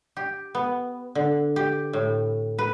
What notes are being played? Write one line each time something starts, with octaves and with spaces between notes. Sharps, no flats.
G4
B3
D3
G4
A2
B4